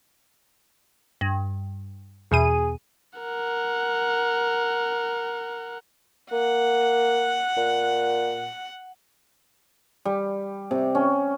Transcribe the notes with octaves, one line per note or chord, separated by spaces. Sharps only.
G2
E2 B2 G#4 D#7
A#4 F#5
A#3 F#5
A#2
G3
C3
C#4